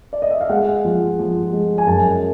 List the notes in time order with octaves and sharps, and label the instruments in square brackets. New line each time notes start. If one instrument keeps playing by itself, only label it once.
[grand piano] D5
D#5
E5
F5
G#3 F#5
F3
F3
G#3
G#5
F#2 A5